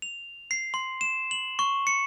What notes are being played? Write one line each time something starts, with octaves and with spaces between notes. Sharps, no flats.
F7
C7
C6
E7
F#7
C#6
C#7